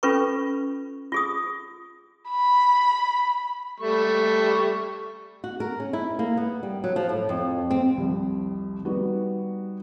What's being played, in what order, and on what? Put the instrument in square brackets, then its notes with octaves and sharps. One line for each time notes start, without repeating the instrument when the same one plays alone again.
[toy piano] C#4 F4 A4 B4 B5 C#6
F4 G#4 D#6
[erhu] B5
[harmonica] G3 A3 C#6
[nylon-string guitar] F#4
A#4
C#4
E4
A#3
B3
G3
F#3
F3
A2
F2
C4
[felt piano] C2 F2
G3 B3 D#4 F#4